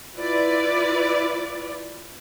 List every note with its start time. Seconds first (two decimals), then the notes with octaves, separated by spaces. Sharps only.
0.16 E4 F4 B4 D5